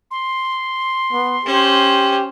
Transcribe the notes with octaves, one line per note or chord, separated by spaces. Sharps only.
C6
B3
C#4 G4 C5